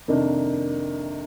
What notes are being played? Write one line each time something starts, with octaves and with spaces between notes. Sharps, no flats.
F2 C3 D#3 A#3 D4